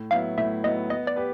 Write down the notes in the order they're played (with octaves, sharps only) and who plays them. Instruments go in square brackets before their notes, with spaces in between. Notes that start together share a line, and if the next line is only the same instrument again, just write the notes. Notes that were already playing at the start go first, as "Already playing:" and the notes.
Already playing: [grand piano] A2
[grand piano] F#3 B3 E4 [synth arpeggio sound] F5
[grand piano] A2 [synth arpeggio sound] E5
[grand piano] F#3 B3 E4 [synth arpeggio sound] D#5
[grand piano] B3 [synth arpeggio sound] D#5
[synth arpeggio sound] D5
[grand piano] G4 B4